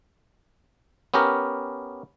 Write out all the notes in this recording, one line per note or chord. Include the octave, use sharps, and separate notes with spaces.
B3 C#4 G4 A#4